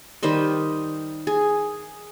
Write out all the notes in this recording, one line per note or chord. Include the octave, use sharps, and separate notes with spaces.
D#3 G3 C5 D#5
G#4